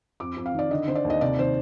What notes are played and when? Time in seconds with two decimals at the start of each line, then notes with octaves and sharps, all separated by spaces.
0.20 F2 D6
0.37 F2
0.46 F5
0.54 D#3 D5
0.71 D3 D#5
0.88 D3 C5
0.95 D5
1.05 D#2
1.10 D#5
1.21 C3 D5
1.39 D#3 C5